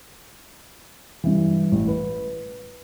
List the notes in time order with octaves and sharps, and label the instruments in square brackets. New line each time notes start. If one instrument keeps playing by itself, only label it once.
[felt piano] G2 E3
A1
B4